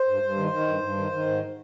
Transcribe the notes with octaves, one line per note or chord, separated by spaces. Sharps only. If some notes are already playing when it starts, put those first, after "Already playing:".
Already playing: C5
G2
G2
D#3
D#3
G2
G2
D#3
D#3
G#2